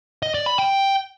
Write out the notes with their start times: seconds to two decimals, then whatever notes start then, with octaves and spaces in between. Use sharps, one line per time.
0.22 D#5
0.34 D5
0.46 B5
0.58 G5